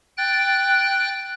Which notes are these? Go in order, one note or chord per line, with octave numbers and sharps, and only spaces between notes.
G5 F#6 A6